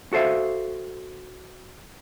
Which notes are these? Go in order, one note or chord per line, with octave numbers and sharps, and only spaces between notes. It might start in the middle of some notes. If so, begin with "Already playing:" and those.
F#4 A4 C5 E5 F5